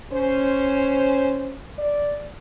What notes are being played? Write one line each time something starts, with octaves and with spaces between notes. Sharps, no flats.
C#4 C5
D5